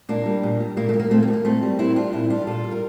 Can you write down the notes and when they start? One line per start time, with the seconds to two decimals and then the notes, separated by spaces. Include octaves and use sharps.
0.09 A#2 A#3 D4
0.26 G3
0.43 A#2
0.60 G3
0.77 A#2 A#3
0.89 A3
0.94 G3
0.99 A#3
1.11 A#2 A3 C4
1.23 A#3
1.28 G3
1.33 A#3
1.45 A#2 A3 C4
1.63 G3
1.79 A#2 C4 E4
1.96 G3 D4 F4
2.13 A#2 C4 E4
2.30 G3 D4 F4
2.47 A#2 F4 A4
2.64 G3
2.71 A#4